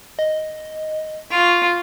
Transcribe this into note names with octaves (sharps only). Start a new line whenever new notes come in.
D#5
F4 C#6